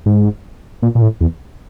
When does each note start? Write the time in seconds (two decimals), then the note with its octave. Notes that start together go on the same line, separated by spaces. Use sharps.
0.06 G#2
0.82 A#2
0.95 A#2
1.02 A2
1.21 E2